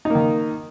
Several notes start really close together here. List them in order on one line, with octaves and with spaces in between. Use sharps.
D#4 A#3 D#3